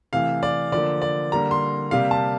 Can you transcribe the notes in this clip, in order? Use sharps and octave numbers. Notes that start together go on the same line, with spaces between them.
C3 E3 A3 F5
D5
D3 F3 A#3 D5
D5
D3 G3 A#3 A#5
C6
C3 G3 A#3 F5
A5